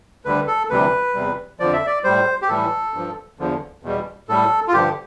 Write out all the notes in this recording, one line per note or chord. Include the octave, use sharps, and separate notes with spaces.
D2 D3 G3 B4
A4
D2 C3 E3 G3 B4
E2 C3 G3
F2 D3 F3 D5
E5
D5
A2 G3 C5
G4
A2 E3 G3 A4
G2 F3
E2 D3 F3
E2 B2 G3
A2 G3 A4
F4
G2 D3 F3 G4